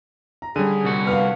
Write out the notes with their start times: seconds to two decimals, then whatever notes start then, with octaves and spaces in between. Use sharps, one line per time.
0.42 A#5
0.56 D3 G3 C#4 G#4 D#7
0.84 C2 F#4
1.07 B3 F5 F6